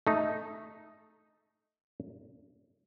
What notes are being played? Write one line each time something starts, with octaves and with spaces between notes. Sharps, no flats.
A3 D#4